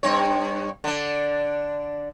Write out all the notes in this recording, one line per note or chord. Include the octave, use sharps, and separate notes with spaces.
G2 C4 C#5
D3 D4